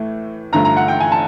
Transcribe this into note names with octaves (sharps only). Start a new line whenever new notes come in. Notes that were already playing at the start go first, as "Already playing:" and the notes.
Already playing: A2 E3 A3
G2 D3 F3 A3 A#5
A#5
F#5
G5
G#5
A5